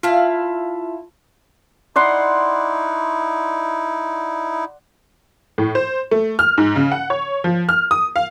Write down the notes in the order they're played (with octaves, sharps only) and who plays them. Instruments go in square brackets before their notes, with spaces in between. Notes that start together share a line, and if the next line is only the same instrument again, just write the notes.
[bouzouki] E4 E5 F5 [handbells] F4 A5
[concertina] D#4 E4 [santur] D5 F#5 C6
[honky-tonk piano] A2
C5
A3
F6
G#2
C#3
F#5
C#5
F3
F6
D#6
F5